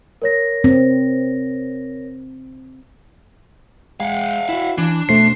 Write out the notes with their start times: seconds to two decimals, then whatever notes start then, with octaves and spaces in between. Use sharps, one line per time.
0.22 A#4 C#5 A#6
0.64 C4
4.00 G#3 F5 F#5
4.49 E4 F#4
4.78 E3 D4
5.09 B2 A3 C5 C7